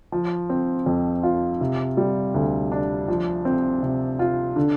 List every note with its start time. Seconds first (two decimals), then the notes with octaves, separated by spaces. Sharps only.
0.12 F3
0.50 C4
0.86 F2
1.23 F4
1.61 C3
1.97 G3
2.34 D2
2.72 D4
3.08 F3
3.45 C4
3.83 C3
4.19 F4
4.56 D3